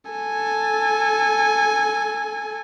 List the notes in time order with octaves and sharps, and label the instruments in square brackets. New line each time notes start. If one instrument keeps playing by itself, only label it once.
[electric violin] A4 G#5